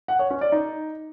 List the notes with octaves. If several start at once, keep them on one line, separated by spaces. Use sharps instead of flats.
F#5
C#5
C#4
D5
D#4